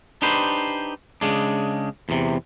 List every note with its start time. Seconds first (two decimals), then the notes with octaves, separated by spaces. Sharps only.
0.22 D4 D#4 G4 B4 C5
1.21 C#3 G#3 D4
2.09 E2 C3